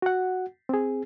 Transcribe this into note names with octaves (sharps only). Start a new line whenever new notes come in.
F#4 F#5
C4 G#4